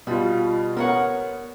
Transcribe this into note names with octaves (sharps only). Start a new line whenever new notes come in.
B2 G3 F4
B3 A#4 C#5 F#5